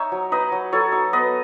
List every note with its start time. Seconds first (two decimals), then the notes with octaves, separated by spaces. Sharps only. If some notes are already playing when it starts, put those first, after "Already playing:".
Already playing: D#4 C#5 E5
0.12 F#3
0.32 D#4 B4 D#5
0.52 F#3
0.72 F#3 A4 C#5
0.92 D#4
1.13 B3 B4 D#5